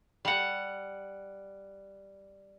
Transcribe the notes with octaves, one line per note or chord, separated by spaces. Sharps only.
G3 F#5